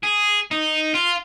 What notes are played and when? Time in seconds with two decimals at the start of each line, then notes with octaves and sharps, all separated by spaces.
0.04 G#4
0.51 D#4
0.95 F4